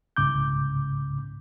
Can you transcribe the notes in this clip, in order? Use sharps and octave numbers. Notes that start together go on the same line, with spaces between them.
C2 G#2 C#3 D6 G6